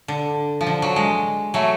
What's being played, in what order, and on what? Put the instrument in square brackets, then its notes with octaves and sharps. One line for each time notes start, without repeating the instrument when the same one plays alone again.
[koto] D3
F3
D3
F#3
G#3
F#3 A3